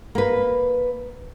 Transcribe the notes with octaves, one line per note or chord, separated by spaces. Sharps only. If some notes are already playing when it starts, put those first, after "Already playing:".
A#3 B4